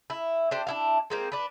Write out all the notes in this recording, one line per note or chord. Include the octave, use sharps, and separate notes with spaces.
E4
D4 G4 C5
D4 E4 F5
G#3 A#3 C4
D4 B4